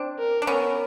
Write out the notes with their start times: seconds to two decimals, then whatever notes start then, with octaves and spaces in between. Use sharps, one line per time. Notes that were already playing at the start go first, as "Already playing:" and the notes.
Already playing: C4 D4
0.19 A#4
0.42 D4
0.47 B3 C#4 A#4